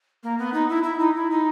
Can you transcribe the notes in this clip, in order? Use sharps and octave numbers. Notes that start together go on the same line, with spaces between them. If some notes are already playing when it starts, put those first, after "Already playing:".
A#3
B3
D#4
E4
E4
D#4
E4
D#4